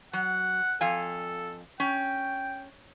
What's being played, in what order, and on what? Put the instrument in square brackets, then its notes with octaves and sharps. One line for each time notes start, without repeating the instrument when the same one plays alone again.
[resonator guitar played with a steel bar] F#3 [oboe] F#5
[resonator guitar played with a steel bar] F2 F5 G#5 [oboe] A4
[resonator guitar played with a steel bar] C#4 [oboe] G5